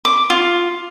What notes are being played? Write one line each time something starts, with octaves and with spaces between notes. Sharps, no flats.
D6
F4